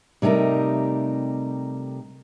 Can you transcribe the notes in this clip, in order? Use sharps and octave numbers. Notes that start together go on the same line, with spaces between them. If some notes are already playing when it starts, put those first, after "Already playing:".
C3 G3 A3 D#4 A#4